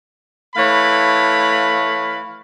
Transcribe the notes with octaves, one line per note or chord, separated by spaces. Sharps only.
E3 A3 C#5 F5 B5